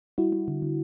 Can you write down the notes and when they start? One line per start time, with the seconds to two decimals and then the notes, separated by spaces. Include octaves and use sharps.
0.18 G3 E4 F#4
0.32 G3
0.48 D3
0.62 D3